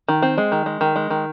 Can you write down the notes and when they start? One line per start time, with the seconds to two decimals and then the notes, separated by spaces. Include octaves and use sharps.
0.08 D#3
0.22 C4
0.38 G#3
0.52 D#3
0.66 G#3
0.81 D#3
0.96 G#3
1.10 D#3